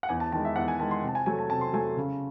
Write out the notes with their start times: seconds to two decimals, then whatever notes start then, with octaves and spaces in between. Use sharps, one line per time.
0.03 F#5
0.09 E2 G#5
0.20 A5
0.32 D#3 G#3 A5
0.45 E5
0.56 E2 F#5
0.68 G#5
0.79 D#3 G#3 A5
0.91 C6
1.02 C3
1.08 A5
1.15 G#5
1.26 F#3 A3 G#5
1.39 A5
1.50 C3 A5
1.61 C6
1.73 F#3 A3 G#5
1.97 C#3